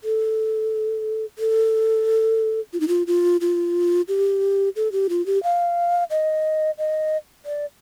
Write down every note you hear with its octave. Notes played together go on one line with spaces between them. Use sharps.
A4
A4
F4
D#4
F4
F4
F4
G4
A4
G4
F4
G4
F5
D#5
D#5
D5